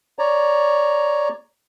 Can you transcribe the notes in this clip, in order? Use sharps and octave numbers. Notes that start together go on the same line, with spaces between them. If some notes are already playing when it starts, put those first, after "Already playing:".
C#5 D5 A#5